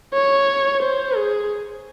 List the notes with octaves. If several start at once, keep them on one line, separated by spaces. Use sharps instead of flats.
C#5
C5
G#4